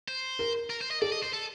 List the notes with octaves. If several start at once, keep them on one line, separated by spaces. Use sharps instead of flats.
C5
A#4
A#4
C5
D#5
A4 D5
D#5
C5
A4